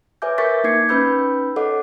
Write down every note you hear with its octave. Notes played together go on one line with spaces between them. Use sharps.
B4 C#5 E5 G#5 D6 G6
A#4 E5 C#6 G6 A6 B6
A#3 D#4 D6 G#6 C7 C#7
C#4 D#4 B4 B5 E6 G6
A4 C#5 D#5 F#5 D6